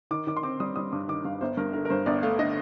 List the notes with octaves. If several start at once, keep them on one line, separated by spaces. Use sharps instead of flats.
D#3 D6
D#3 D6
C6
C4 D6
G3 D#6
G3 D#6
G2 D6
D#3 D6
G2 F5
G1 C5
G2 A#4
D3 A#4
A#4
G2 C5
G1 D5
A3 F5
D3 D#5